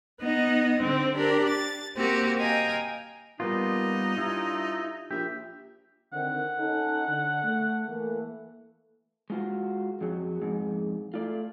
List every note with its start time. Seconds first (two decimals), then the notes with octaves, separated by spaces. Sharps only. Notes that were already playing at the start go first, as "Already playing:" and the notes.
0.21 B3 D#4 D#5
0.79 D3 C4
1.15 D4 G4 A#4
1.48 A6
1.96 A#3 C4 F#4 G4
2.39 D#5 F5 G5 G#5 A#5
3.40 A#2 G3 B3 D#4 F4
4.17 G2 E4 F4
5.11 A#1 G4 E5
6.13 D3 D#3 C4 F#5
6.58 C#4 D#4 A4
7.07 D3
7.43 A3
7.88 E3 A3 A#3
9.30 G#3 F4 F#4
10.01 F2 F#3 G#4
10.42 F2 G#2
11.14 A3 F4 D5